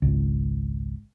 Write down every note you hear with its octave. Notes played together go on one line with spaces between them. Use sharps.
G#1 C#2